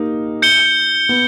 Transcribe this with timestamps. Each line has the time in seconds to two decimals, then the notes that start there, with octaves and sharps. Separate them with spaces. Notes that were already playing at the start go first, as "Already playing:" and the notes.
Already playing: A#3 D#4 G4
0.42 G6 C#7 G7
1.09 B3